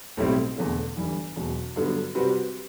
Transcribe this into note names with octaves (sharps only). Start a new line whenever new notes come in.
B1 A2 G3 C4 E4
E1 E2 D3 A3
G1 G2 E3
E1 E2 B2 F#3
G2 D3 F#3 B3
C3 G3 C4 F#4 B4